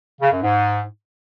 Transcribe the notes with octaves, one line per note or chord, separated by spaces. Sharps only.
C#3
F#2
G#2